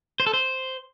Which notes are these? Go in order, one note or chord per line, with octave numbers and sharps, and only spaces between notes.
C5
A4
C5